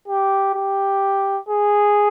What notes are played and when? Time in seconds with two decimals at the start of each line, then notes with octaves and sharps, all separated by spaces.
0.08 G4
0.54 G4
1.49 G#4